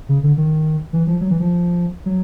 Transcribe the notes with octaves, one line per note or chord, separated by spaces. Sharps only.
C#3
D3
D#3
E3
F3
F#3
E3
F3
F#3